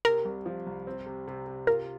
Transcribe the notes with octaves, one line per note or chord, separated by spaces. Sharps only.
C3 A#4
C2
F3
C2
C4
C3
C3
C3
F4 A#4